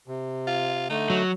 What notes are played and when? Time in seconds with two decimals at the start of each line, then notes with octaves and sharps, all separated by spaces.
0.08 C3
0.47 F4
0.90 D3 A3 D#4
1.10 F#3